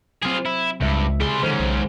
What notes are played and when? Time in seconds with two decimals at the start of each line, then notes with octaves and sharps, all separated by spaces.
0.23 F#3 C4 F4 G#4
0.45 E4
0.81 C#2 G2 C#3 G#3 E5
1.20 G3 G#4 C6
1.43 G#2 D3 D#3 C#4 C5
1.59 B1